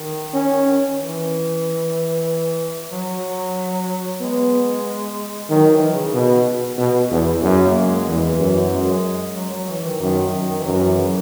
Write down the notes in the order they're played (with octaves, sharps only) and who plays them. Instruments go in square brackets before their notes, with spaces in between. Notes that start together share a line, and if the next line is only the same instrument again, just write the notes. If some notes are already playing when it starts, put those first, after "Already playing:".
Already playing: [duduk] D#3
[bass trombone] C#4
[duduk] E3
F#3
[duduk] G#3 [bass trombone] B3
[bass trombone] D#3 [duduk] F#3
[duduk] E3
C#3
[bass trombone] B2
B2
E2
[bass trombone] F#2 [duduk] C#3
[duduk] A#3
G#3
[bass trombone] E2 [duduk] E3
[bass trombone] F#2
[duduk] G#3
F#3
F#3
E3
D#3
[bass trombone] F#2 [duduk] D#3
[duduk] E3
[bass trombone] F#2 [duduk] F#3
[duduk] E3
C#3